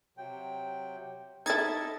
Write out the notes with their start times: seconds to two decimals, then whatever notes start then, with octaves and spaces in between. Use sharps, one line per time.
0.17 C3 F#3 G5
1.46 D#4 E4 A4 D#5 E5 G#6 A6